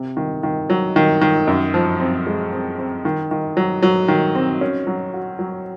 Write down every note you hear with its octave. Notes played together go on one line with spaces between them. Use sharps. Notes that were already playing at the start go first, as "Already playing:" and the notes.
Already playing: C3
D#3
D#3
F#3
D#3
D#3
F#2
F3
C4
G#3
C4
C4
D#3
D#3
F#3
F#3
D#3
C4
C#4
F#3
F#4
F#3